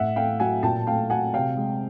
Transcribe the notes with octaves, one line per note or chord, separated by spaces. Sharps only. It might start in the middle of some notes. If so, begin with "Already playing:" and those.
Already playing: A2 E5 F#5
A3 F5 G5
F#3 F#5 G#5
A#2 G5 A5
A3 F5 G5
F#3 F#5 G#5
C3 F5 G5
G#3